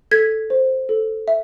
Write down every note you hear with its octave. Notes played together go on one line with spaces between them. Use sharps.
A4 G#6 B6
C5
A4
E5